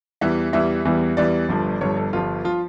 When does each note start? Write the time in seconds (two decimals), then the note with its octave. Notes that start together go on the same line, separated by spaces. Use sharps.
0.21 E2 E3 G3 E5
0.53 E2 E3 G3 E5
0.85 E2 E3 G3
1.17 E2 E3 G3 D5
1.49 G1 G2 F3
1.81 G1 G2 F3 C#5
1.97 A4
2.13 G1 G2 F3 F4
2.44 F3 F4